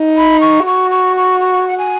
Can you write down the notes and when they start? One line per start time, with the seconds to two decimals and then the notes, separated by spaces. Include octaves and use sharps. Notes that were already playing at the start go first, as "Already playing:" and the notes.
Already playing: D#4
0.17 B5
0.41 C#6
0.66 F#4 C#6
0.91 C#6
1.16 C#6
1.40 C#6
1.68 F#5
1.78 G#5